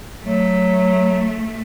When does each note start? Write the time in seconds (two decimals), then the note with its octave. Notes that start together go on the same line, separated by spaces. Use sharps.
0.23 F#3 A3